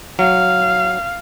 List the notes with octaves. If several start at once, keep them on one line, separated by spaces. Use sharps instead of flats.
F#3 F5